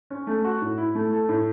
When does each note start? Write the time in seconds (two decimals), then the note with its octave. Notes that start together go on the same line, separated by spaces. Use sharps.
0.10 C#4
0.27 A3
0.44 F#4
0.61 A2
0.78 E4
0.95 A3
1.12 A4
1.29 A2